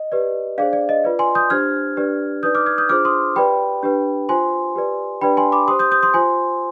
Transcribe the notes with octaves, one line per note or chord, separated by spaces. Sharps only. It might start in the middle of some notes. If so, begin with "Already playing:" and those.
Already playing: D#5
G4 B4 D5
D4 G#4 C5 D5 F5
D5
D#5
F4 B4 D5
G#5 C6
D#6 G6
D4 G4 C5 F6 G#6
D4 G4 B4 D5
D#4 B4 D5 D#6 G6
D6 F6
F6 G#6
D#6 G6
D4 F4 G#4 C5 D6 F6
C6 D#6
G4 B4 D5 G5 B5
D4 G4 B4
F4 C5 G#5 C6
G4 B4 D5
D4 G4 B4 D5 G5 B5
G#5 C6
B5 D6
G4 C5 C6 D#6
D#6 G6
D#6 G6
C6 D#6
F4 C5 G#5 C6